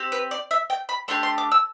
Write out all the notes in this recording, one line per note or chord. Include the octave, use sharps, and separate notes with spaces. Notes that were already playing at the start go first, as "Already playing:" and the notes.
Already playing: C4 G4
B4
D5
E5
G5
B5
A3 D4 G4 C6
C6
D6
E6